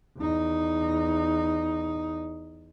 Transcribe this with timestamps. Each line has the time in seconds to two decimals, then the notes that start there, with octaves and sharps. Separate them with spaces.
0.18 E2 D#4